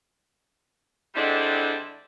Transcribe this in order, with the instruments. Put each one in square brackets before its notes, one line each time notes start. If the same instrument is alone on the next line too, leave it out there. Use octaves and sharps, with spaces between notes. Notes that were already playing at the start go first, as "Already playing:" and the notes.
[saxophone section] D3 G3 G#3 C4 D4 E4